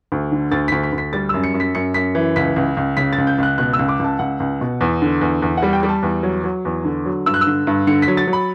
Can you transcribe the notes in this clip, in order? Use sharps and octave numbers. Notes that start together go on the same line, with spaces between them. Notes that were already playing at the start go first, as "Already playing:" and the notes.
D2
D3
D2 A6
D2 B6
B6
D2
B6
G3 A6
F#2 E6
C#7
F#2
B6
F#2 C#7
F#2 B6
E3
C#2 B6
C#2
C#2
C#3 B6
A6
C#2
G6
C#2 F#6
B2 F#6
E6
C#2
D6
C#2 A5
C#2 F#5
C#2
B2
E2
D3
E2
E2
F#5
G3
G5
G3
A5
E2
F#3
F#3
E2
D3
F#3
G2 E6
F#6
E6
D3
G2
D3 C#7
B6
F#3
A6
F#3
B5